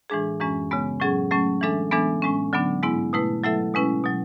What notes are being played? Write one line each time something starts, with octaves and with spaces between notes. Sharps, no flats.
A2 E3 G#3 D4 G#4
F#2 E3 G#3 C#4
C#3 G#3 B3
A2 F#3 C#4 G#4
F#3 A3 C#4
E3 G#3 D4 A4 E5
E3 G#3 B3 D4 A4
A2 G#3 C#4
D3 F#3 B3 D4
G#2 G#3 B3 E4
B2 A3 E4 B4
F#3 A3 E4 A4 E5
B2 G#3 C#4 E4 B4
B2 F#3